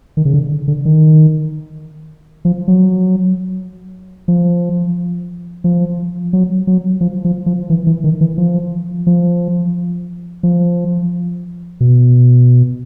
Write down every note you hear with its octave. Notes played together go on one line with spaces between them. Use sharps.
D#3
C#3
D3
D3
D#3
F3
F#3
F3
F3
F#3
F#3
F3
F3
F3
E3
E3
D#3
E3
F3
F3
F3
B2